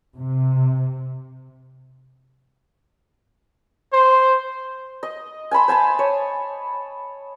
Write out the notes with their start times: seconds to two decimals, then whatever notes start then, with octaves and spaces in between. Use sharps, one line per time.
0.17 C3
3.93 C5
5.03 D#5
5.51 G#5 A5 B5 C6
5.68 C5 G#5 A5 B5
5.99 C#5